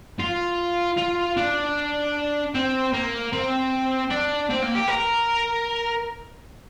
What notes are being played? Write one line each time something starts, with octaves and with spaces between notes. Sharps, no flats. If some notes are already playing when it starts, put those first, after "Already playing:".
F4
F4
D4
C4
A#3
C4
D4
C4
A#3
G4
A#4